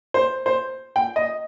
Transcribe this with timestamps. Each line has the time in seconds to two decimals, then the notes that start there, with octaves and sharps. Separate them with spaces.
0.14 C5
0.46 C5
0.96 G5
1.16 D#5